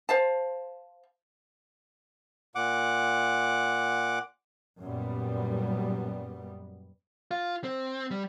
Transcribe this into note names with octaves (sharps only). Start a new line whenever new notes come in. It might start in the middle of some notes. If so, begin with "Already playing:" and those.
C5 F5 A5
A#2 F#5 D6
F#2 A#2 G3 B3
F4
C4
G3